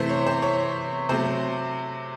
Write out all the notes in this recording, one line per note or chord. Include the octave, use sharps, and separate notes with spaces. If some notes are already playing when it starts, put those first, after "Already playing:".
Already playing: C3 E3 A3 C5
C#5
C5
C#5
C3 F#3 A3 C5